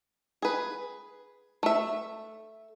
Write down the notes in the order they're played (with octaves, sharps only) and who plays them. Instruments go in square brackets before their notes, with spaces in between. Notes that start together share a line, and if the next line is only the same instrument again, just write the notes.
[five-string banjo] G#4 B4
A3 E5